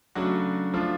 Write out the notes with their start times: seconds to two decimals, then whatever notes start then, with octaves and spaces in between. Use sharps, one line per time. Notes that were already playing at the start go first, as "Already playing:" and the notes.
0.15 C#3 F#3 A3 D4 F#4
0.73 F3 A3 D4 F4